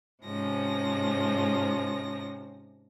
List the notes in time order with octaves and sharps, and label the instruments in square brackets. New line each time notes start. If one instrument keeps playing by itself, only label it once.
[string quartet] G#2 C3 F3 C#4 A#6